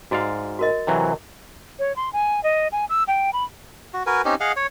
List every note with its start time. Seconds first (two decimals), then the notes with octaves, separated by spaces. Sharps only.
0.11 G#2 F#4 D5 F5
0.59 F#4 A#4 D#5
0.87 C3 E3 F#3
1.79 C#5
1.96 C6
2.13 G#5
2.44 D#5
2.72 G#5
2.89 E6
3.08 G5
3.33 B5
3.94 F#4
4.07 F#4 A#4 B4 G#5
4.25 C4 C#4 D#4 G4
4.40 G#4 D#5 F5 F#5
4.56 C#5